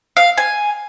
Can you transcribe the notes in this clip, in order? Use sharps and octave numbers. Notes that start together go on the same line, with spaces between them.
F5
G#5